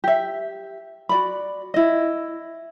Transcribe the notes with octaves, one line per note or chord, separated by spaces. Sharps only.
G4 E5
F#4 D5 B5
E4 D#5